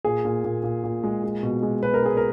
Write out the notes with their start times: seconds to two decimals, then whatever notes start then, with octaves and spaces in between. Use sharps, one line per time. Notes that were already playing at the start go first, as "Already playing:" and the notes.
0.05 A#2 G#4
0.25 A#2
0.44 A#2
0.63 A#2
0.84 A#2
1.04 G#3
1.24 G#3
1.43 B2
1.63 G#3
1.83 B2 B4
1.94 A#4
2.03 G#3 G#4
2.17 A#4